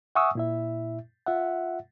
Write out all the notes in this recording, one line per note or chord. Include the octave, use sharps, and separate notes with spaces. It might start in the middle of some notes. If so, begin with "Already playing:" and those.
E5 F#5 G#5 C#6 D#6 E6
A#2 E4 E5
F4 E5 F#5